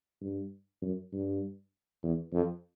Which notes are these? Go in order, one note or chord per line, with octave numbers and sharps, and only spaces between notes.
G2
F#2
G2
E2
F2